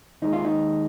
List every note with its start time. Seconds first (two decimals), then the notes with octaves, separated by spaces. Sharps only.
0.22 D#2 D#3 G#3 D#4
0.33 F4
0.45 D#4